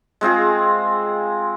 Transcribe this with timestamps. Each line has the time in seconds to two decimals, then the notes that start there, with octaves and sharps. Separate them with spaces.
0.21 G#3 C4 F4 G#4